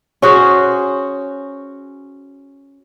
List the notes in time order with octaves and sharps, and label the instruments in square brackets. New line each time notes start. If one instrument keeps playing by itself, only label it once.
[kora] C#4 F#4 G#4 C5